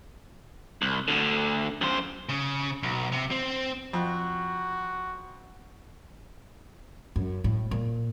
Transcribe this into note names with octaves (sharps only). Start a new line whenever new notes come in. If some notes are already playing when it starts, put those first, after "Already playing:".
C2
D2 D3
F#2 C5
C#3
B1
C3
C4
F2 F#4
F#2
A2
A#2